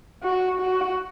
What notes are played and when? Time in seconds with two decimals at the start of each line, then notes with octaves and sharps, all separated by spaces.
0.23 F#4
0.60 F#4